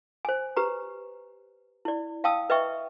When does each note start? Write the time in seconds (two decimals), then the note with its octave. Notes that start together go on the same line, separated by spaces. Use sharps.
0.25 C5 G#5
0.56 G4 B4 A#5
1.85 E4 D5
2.24 F5 G5 A5 D#6 E6
2.50 B4 D#5 E5 G5 C#6